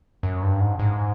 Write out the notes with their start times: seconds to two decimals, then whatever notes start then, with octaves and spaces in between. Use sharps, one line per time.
0.23 F#2
0.43 G2
0.61 G#2
0.79 G#2